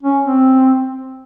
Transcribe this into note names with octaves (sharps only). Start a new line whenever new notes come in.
C#4
C4